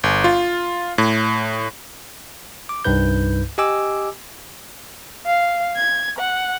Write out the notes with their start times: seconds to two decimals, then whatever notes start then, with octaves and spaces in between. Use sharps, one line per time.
0.03 G1
0.24 F4
0.98 A2
2.69 D6
2.85 C2 G2 D#4 B4 G6
3.58 G4 D#5 G#5 D6 E6
5.27 F5
5.76 G#6
6.19 F#5